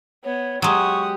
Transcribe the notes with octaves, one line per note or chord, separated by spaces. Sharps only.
B3 C#5
F#3 G#3 G4 F#5 C#6 D#6